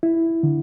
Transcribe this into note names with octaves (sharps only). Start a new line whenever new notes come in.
E4
D3